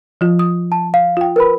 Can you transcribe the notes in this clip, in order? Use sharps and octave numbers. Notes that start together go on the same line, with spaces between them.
F3 F4
D#6
A5
F5
F4 G5
A#4 B4 B5